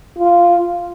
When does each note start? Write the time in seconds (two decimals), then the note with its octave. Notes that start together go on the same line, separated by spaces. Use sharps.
0.18 F4